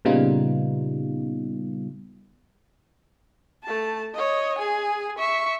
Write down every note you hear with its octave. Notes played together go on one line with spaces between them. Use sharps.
A#2 C#3 G3 B3 D#4 F4
A3 A5
C#5 D#5
G#4 G#5
E5 C#6